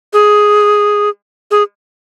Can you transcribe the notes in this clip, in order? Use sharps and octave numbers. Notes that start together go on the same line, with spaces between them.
G#4
G#4